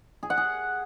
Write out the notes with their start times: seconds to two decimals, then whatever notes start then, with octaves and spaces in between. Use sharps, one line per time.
0.23 G#4
0.30 F#5
0.37 G#4